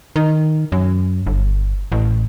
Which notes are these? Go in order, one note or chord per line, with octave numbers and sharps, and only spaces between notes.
D#3
F#2
G1
A1